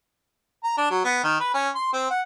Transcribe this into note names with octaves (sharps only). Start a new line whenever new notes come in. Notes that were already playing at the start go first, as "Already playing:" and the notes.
A#5
D4
F#3
B3
D#3
B4
C#4
C6
C4
F#5